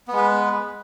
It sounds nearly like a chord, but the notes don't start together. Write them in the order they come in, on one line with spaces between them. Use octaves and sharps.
B3 G#3 B4